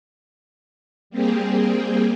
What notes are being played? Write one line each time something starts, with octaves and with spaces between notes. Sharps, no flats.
G3 A#3 C4 G4 G#4